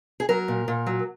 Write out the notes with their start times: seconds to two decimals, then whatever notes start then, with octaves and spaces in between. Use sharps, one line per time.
0.20 G#4
0.29 F#3 A#4
0.48 A#2
0.68 A#2
0.87 F#3